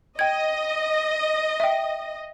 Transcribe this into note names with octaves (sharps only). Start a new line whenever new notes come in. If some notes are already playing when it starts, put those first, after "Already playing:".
D#5 G5 G#6
E5 G5